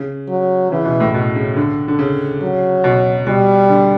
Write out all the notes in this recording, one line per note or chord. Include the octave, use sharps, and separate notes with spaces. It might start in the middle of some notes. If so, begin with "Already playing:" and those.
Already playing: C#3
F#3
C#3 E3
B2
A2
B2
C#3
D3
D3
C#3
F#3
B2
B2 G3
D3